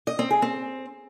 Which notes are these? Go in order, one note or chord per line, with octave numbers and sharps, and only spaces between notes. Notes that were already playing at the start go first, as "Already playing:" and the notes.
D#5
C4
G#4
C4